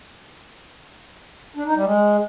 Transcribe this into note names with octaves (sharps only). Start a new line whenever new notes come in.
D4
D#4
G3
G#3